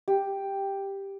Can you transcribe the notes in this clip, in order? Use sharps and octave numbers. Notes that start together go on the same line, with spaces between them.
G4